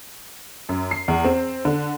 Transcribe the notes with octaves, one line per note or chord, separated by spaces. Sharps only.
F#2
C7
E2
C4
D3